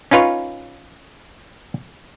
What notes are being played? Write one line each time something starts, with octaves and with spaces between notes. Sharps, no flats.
C#4 D#4 F4 B4 C#5